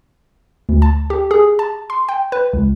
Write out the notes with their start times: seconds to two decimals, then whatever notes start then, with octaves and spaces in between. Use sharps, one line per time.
0.69 D2
0.82 A5
1.10 G4
1.31 G#4
1.59 A5
1.90 C6
2.09 G5
2.32 B4
2.53 C#2